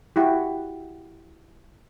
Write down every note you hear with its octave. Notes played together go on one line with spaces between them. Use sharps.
E4 F#4 G4